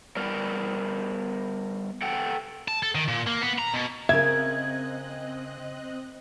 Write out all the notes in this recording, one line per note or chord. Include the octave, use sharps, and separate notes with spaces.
G3 B3 A#4
A4 F#5 G5
A5
A4
D#3
A#2
A#3
B3
A#5
B2
C#3 C4 A#4 D#5 E5 F#6 G#6